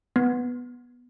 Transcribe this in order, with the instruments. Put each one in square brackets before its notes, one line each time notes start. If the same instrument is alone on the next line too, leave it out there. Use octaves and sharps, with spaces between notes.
[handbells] B3